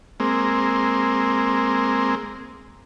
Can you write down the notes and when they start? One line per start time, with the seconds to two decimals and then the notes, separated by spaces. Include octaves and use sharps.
0.20 G#3 A#3 C4